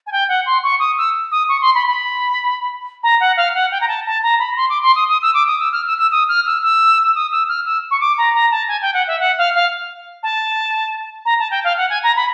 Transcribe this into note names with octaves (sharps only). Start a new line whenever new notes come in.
G#5
G5
F#5
C6
C#6
D#6
E6
D#6
C#6
C6
B5
B5
A#5
F#5
F5
F#5
G5
A#5
A5
A5
A#5
B5
C6
D6
C6
D#6
D#6
E6
D6
D#6
E6
F6
E6
E6
D#6
F6
E6
E6
E6
D#6
E6
F6
E6
C#6
D6
A#5
A#5
A5
G#5
G5
F#5
E5
F#5
F5
F5
A5
A#5
A5
G5
F5
F#5
G#5
A#5
B5